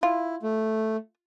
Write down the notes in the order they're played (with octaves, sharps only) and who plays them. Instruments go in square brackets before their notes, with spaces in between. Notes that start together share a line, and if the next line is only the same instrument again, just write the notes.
[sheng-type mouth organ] E4 [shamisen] F4
[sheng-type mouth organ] A3